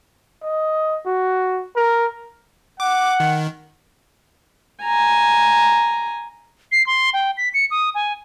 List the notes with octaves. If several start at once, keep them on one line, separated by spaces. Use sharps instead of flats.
D#5
F#4
A#4
F#5 D6
D#3
G#5 A#5
C7
C6
G5
B6
C#7
D#6
G#5